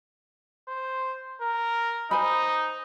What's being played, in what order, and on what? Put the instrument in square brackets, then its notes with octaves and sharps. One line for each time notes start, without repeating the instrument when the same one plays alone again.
[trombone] C5
A#4
[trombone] D#4 [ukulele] C5 G#5 B5